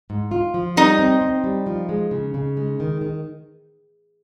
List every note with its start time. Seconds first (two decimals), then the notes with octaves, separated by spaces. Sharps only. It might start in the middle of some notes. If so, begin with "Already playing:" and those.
0.10 G#2
0.31 F4
0.54 F3
0.76 G3 D#4
0.99 C4
1.21 C4
1.44 G3
1.67 F3
1.89 G#3
2.11 C#3
2.34 C#3
2.57 G#3
2.80 D#3
3.01 D#3